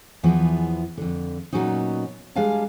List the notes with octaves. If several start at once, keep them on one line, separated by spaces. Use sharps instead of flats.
E2 E3 F3 B3 G#4
F2 D3
A#2 D3 F#3 B3 C#4 D#4
G3 G#3 D4 F5 G#5 A5